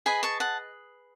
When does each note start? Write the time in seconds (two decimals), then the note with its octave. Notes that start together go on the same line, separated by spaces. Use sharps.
0.06 G#4 B4 D#5 G#5 B5
0.23 A5 C#6
0.40 F#5 A5